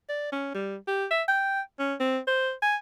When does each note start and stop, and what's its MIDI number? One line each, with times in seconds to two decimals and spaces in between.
0.09 0.30 74
0.32 0.52 61
0.54 0.76 55
0.88 1.06 67
1.11 1.23 76
1.28 1.61 79
1.79 1.94 61
2.00 2.19 60
2.27 2.52 72
2.62 2.76 80